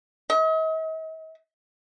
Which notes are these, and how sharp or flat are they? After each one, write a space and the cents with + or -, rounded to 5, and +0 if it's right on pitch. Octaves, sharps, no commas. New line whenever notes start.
D#5 +45